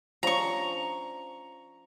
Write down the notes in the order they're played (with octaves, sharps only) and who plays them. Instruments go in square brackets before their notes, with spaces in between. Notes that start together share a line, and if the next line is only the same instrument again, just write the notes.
[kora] F3 C#4 D4 [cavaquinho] A#5 C#6